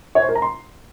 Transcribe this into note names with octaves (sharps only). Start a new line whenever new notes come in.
C#5
C5
A#4
A#5
C6